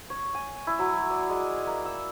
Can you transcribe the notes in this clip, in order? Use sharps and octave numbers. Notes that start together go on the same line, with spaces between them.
C#5
G#5
E4
F#3
D5
G#3
A#3
E6